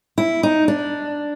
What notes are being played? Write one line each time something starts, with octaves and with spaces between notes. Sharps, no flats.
E4
D#4
D4